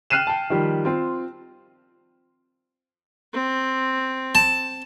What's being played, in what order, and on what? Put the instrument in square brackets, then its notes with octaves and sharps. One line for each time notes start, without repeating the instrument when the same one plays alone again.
[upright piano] G5 F6 F#6 C7 D#7 E7
G5 A5
D#3 F3 G3 G4
C4 F4
[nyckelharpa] C4
[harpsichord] A5